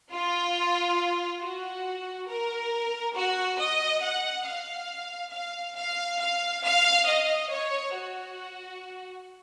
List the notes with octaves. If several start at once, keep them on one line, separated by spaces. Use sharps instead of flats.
F4
F#4
A#4
F#4
D#5
F#5
F5
F5
F5
F5
F5
D#5
C#5
F#4